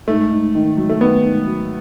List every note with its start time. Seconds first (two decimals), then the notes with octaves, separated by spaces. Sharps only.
0.08 G#2 A3
0.31 G#2
0.55 D#3
0.77 F#3
0.89 A3
1.01 D#3 B3
1.24 G#2
1.46 F#3